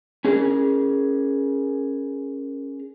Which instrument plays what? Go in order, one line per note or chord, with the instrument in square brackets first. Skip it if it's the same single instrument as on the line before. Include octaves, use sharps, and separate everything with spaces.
[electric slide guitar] C#4 G#4 A#4